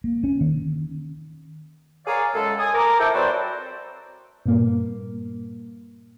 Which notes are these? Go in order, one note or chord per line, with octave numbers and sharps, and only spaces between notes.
A#3
C#4
D#3
G#4 A#4 C#5 D5 F5
F#2 G#3 A4
G#5 D#6
A#4 A#5 D6
E4 A4 C5 G5
F#3 C4 F#4 B4 C5 D5
G2 A#2 A#3